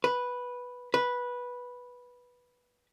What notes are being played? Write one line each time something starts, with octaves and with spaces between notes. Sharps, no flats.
B4
B4